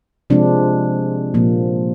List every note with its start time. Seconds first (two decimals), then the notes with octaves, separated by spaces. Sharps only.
0.30 C3 F3 G#3 C4 D4
1.34 A#2 F3 A#3